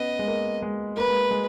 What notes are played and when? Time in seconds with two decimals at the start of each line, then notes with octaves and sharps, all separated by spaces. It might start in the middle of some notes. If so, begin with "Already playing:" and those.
Already playing: B3 C#4 D#5
0.19 G#3
0.28 A#3
0.62 G#3
0.97 A#3 B4
1.08 G#3
1.31 G#3